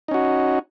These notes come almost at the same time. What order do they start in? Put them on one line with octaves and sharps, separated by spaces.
D#4 C#4 F#4